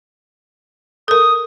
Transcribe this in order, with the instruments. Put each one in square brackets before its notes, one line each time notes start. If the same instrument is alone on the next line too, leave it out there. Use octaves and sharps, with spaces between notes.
[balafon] A4 A#4 [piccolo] D#6